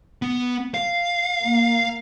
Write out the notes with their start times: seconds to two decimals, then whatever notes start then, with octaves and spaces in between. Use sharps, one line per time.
0.22 B3
0.74 F5
1.44 A#3